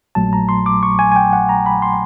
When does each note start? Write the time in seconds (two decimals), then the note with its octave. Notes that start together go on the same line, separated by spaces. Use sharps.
0.15 A#1 A#2 F#3 A3 A5
0.33 A#5
0.49 C6
0.66 D6
0.83 C#6
0.99 G#5
1.12 G#5
1.16 G5
1.33 F#5
1.49 A#5
1.66 B5
1.82 C6